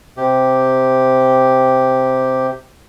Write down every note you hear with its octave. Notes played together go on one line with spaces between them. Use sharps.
C3 G4